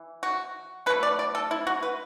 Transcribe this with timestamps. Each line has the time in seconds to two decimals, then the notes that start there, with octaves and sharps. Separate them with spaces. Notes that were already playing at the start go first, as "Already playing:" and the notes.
Already playing: E3
0.23 F#4
0.86 B2 F#3 A3 B4
1.03 D5
1.19 D5
1.35 A4
1.51 E4
1.67 F#4
1.83 B4